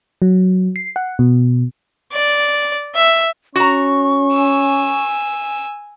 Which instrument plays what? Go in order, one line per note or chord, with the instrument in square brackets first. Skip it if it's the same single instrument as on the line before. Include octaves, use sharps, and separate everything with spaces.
[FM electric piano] F#3
C7
F#5
B2
[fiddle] D5
E5
[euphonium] C#4 [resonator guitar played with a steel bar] F#4 A#5 [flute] C#6
[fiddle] G#5 E6